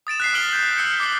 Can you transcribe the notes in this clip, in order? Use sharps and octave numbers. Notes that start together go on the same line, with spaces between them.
D#6 A6 D7 E7
F#6 B6 C7
D#6 F6 D7 F#7 G7
G6 F#7
E6 F6 C#7
D6 C7 C#7 G7